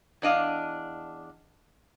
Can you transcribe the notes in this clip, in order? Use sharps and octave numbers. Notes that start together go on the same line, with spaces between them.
E2 D4 D#5 F5